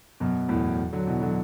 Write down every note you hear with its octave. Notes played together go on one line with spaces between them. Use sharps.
F#2 B2
E2 A2
D3 F#3
B2 E3
D3 F#3